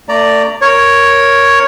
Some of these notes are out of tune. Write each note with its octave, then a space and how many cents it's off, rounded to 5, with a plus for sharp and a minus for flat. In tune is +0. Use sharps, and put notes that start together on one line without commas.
A3 +35 D5 +0 A#5 +0
A#4 +0 C#5 +0